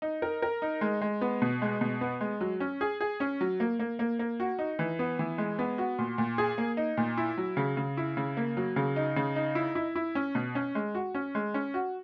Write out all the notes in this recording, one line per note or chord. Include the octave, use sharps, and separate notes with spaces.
D#4
A#4
A#4
D#4
G#3
G#3
B3
B2
G#3
B2
B3
G#3
F#3
C#4
G#4
G#4
C#4
F#3
A#3
A#3
A#3
A#3
F#4
D#4
E3
B3
E3
G#3
B3
F#4
A#2
A#2
G#4
A#3
D#4
A#2
E4
F#3
C#3
C#3
E4
C#3
A#3
F#3
C#3
D#4
C#3
D#4
E4
E4
E4
C#4
B2
C#4
G#3
F#4
C#4
G#3
C#4
F#4